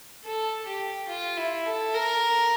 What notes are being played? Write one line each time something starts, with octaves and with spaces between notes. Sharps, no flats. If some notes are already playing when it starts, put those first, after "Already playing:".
A4
G4
F4
E4
A4
A#4